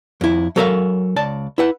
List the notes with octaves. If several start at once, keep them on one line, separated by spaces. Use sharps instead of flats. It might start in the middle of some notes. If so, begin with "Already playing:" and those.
F2 E4
F#3 A4 A#4 C5 E5 F5
C#2 D5 A5
E4 B4 F#5